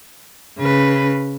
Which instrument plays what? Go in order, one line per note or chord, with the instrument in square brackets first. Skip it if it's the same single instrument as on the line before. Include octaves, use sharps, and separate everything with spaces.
[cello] C#3 B4